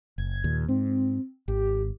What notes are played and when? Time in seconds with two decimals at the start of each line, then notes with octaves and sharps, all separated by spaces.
0.18 F#1 G#6
0.44 D#2 A#2
0.68 G#2 C4
1.48 G#1 G4